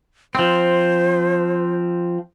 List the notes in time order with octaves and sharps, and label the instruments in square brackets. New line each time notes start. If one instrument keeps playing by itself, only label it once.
[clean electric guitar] F3 C4 [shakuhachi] C5